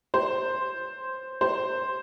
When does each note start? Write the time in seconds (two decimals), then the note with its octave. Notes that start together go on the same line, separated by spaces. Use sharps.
0.14 C5
1.41 C5